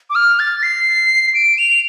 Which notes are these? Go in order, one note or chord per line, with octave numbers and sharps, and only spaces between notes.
D6
F6
A6
C7
D7
F7